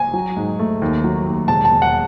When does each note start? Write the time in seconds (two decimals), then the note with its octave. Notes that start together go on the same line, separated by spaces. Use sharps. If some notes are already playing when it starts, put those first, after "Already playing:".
Already playing: G#5
0.13 F#3
0.36 G#2
0.59 A3
0.82 D#2
1.04 F#3
1.26 D#2
1.48 E1 A5
1.65 A5
1.72 E1
1.82 F#5